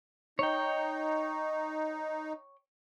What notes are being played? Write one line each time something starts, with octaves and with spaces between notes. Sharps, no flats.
D#4 C#5 G5